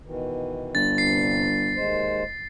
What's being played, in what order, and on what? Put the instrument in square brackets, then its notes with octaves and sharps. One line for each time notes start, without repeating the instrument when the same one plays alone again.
[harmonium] B2 D#3 E3
[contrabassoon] G1 [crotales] A6
[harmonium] G2 C3 [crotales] C7
[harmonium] D#2 G#3 C5